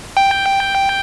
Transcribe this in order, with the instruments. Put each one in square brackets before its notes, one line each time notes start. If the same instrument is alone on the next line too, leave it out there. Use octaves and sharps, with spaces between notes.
[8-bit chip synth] G5